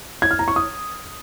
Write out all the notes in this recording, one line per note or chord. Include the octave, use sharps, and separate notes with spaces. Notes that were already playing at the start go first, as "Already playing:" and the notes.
G#6
F6
A#5
C#6
D#6